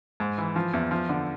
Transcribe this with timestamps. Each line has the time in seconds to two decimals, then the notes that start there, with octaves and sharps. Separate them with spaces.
0.20 G#2
0.38 E3
0.56 F3
0.73 E2
0.91 F3
1.09 D3